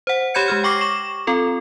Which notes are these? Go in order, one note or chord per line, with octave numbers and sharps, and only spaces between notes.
C5 F#5
G4 C#5 B5 G6 G#6 C#7
G#3 G4 F6
G5 C#6 D6 A#6 C7
C#6 E7
C4 F4 A4